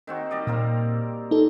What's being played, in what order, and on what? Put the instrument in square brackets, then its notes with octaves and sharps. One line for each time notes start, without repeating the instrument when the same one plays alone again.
[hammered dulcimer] D#3 C4 F#4
G3 D5 D#5
[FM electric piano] A#2 [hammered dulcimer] A#3 C4 A#4
[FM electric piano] D#4 A4